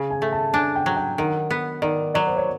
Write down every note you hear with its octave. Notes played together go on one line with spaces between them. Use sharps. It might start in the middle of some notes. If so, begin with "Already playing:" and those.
Already playing: C#3
G#5
A3
A5
D4 G#5
G5
F#3
G5
D#3 F#5
B3
D#3 D5
F#3 D5
C5
C#5